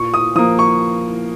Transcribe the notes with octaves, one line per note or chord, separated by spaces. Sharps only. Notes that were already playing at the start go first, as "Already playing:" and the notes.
Already playing: A#2 C#6
D#6
F3 A#3 D#6
C#6